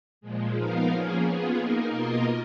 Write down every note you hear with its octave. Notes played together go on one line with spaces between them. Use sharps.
A#2 F3 G#3
F3 B3 D#4 A#4 F5
F3 A#3 C#4 G#4
B3 F4 G#4
A#3 D#4 A#4
B2 A#3 F4 A#4 D#5